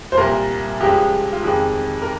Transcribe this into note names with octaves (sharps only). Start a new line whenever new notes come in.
C5
C2 A#2 G3 A#4
C#2 C#3 F3 G#3 G4
F4
F2 D#3 G#3 G4
A#4